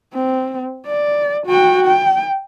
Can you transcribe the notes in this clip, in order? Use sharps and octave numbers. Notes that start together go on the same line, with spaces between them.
C4
D5
F#4 G5
G5